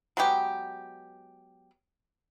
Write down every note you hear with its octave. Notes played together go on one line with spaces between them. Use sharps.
F#3 G#3 B3 G4